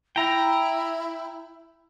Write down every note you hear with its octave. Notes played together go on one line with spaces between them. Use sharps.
E4 G5 A#5